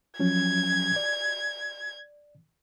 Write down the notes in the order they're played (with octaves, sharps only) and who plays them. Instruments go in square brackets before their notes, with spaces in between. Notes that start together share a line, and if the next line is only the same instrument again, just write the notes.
[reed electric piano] F3 F#3 C#4 [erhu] G#6
[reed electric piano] D5